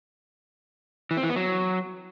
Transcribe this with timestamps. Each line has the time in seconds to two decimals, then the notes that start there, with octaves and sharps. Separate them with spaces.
1.11 E3
1.17 C4
1.23 E3
1.30 B3
1.36 F#3